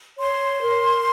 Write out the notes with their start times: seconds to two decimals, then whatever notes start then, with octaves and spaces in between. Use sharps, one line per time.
0.17 C#5 C6
0.60 A#4